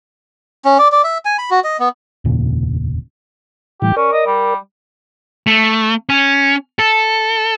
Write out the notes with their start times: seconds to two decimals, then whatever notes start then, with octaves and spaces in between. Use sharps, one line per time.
0.65 C#4
0.79 D5
0.92 D5
1.04 E5
1.25 G#5
1.38 B5
1.51 F#4
1.64 D#5
1.79 B3
2.25 F1 D#2 A#2 C#3
3.82 A2 E3 G3 G4
3.97 C#4 A#4 D5
4.13 D#5
4.27 G3
5.47 A3
6.09 C#4
6.79 A4